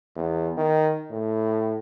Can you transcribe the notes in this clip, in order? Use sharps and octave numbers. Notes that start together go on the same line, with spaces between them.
E2
D#3
A2